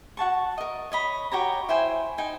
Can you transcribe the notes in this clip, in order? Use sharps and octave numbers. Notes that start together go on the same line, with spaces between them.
F#4 F#5 A5 C#6
A#4 D#5
C#5 D#5 B5
F#4 G4 C#5 A#5
E4 C5 G5 G#5
D#4 G5 G#5